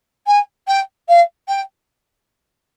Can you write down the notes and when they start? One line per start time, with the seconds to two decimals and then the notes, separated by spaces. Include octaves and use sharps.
0.26 G#5
0.67 G5
1.08 F5
1.48 G5